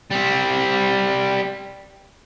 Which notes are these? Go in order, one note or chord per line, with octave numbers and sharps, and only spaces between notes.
G3 C4